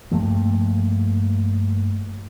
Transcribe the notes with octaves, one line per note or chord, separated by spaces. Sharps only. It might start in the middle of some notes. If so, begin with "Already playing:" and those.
G2 F3 A3 A#3